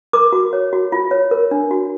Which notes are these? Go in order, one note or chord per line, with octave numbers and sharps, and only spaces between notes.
A#4 D6
F#4
C#5
F#4
F4
C#5
A#4
D4
F#4